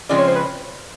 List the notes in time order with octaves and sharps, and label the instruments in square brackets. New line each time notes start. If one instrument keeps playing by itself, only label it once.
[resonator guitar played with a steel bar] C#3 F3 G#3 C4 [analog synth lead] D5
[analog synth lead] C#5
C5
B4